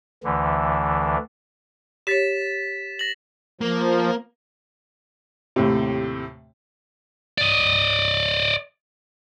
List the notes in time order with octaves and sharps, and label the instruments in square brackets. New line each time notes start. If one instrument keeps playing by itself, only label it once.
[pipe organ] D2 D3 E3
[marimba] G4 C#5 [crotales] A6 B6 E7
[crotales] A#6 F#7
[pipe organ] F3 [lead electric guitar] A#3
[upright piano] D#2 A2 C3
[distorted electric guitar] D5 D#5